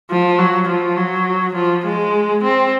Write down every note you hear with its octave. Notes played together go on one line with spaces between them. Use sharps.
F3
F#3
F3
F#3
F3
G#3
C4